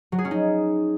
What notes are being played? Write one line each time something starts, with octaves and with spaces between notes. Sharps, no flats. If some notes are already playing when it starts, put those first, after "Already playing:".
F#3
G#4
C#4
D#4